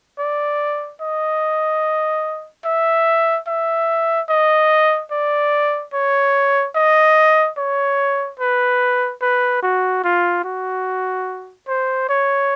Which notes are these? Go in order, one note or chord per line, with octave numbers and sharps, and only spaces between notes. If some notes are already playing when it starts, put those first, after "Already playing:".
D5
D#5
E5
E5
D#5
D5
C#5
D#5
C#5
B4
B4
F#4
F4
F#4
C5
C#5